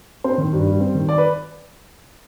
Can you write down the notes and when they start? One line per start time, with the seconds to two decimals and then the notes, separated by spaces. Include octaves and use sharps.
0.24 C4 C5
0.38 D#3
0.53 G2
0.66 G3
0.80 C4
0.95 D#3
1.09 D5
1.18 B4